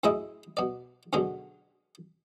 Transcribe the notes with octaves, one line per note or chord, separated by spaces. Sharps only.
F#2 A2 G#3 E4 G#4 D#5
B2 D5
F#2 B2 D3 F#3 G#3